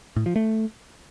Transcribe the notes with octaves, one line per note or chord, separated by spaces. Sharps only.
A2
F3
A3